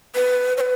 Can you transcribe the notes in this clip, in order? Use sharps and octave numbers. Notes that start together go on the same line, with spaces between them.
B4
C#5
B4